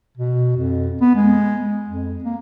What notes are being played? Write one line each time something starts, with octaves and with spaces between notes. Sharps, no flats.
B2
F2
B3
G#3
F2
A#3